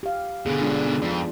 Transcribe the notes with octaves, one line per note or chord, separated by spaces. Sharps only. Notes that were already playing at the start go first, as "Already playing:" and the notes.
G4 F5
B2 D3 B3 G#4
G#3 D4 F4
B3 D#4
F2 F4 D5